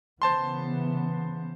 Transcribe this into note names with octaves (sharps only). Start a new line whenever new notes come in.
C#3 E3 B3 C5 A5 C6